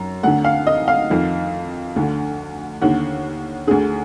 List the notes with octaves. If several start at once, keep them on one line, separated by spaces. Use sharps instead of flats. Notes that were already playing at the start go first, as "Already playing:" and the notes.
Already playing: F#2
D2 D3 F#5
F5
D#5
F5
F2 D#3
D2 D3
D#2 D3 F#5
D2 D3 G#4